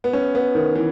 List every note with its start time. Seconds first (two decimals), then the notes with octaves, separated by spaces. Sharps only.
0.04 B3
0.13 C#4
0.35 B3
0.55 D#3
0.75 E3